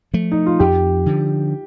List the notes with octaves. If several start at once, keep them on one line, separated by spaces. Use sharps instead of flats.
F3 A3
D#4
F4
F2 G4
D3 F3